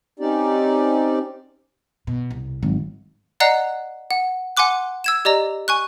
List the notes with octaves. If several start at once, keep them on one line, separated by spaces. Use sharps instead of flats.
C4 C#4 D#4 G4 D5
B2
C2
G#1 F#3
D5 D#5 F#5 A#5 F#6 C7
F#5
F#5 G#5 C6 D6 F#6
E6 G#6 E7
G4 D5 D#5 A#5
G#5 C#6 F#6